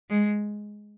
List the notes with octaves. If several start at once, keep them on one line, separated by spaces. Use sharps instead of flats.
G#3